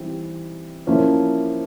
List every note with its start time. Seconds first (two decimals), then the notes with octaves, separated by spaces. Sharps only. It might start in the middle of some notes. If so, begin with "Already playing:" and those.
Already playing: E3 G3 C4 D#4
0.87 F3 A#3 C#4 E4